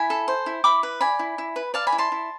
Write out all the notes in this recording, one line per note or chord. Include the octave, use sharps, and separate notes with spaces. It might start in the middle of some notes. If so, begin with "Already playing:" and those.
Already playing: E4 G#5 B5
A4
C5
E4
E4 B5 D6
B4
D5 G#5 B5
E4
E4
B4
D5 F5 A5
G#5 B5
E4
A5 C6
E4